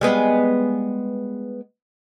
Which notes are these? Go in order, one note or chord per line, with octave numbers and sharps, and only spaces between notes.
G3 G#3 B3